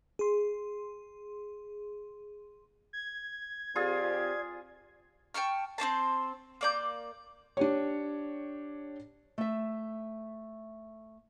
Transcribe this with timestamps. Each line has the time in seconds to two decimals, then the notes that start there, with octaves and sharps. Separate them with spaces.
0.19 G#4 C6
2.93 G#6
3.76 F2 C4 F4 G4 G#4 D5
5.34 G5 A5 C#6 F6
5.78 C4 C#4 C5 A5
6.61 A#3 D5 G6
7.57 D4 G4 C#5
9.38 A3 E5